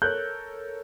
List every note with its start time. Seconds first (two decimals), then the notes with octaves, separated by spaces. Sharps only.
0.02 A4 A#4 C#5 F#6 G6